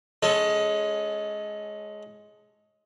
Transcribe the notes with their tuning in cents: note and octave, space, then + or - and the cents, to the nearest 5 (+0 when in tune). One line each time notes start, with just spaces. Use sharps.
G#3 +15 C#4 +0 A4 +0